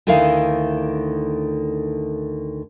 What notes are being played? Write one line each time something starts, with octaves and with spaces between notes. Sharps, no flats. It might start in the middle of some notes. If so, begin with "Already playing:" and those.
D2 D3 D#3 E4 F5